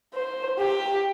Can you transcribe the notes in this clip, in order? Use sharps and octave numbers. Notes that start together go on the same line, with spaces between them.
C5
G4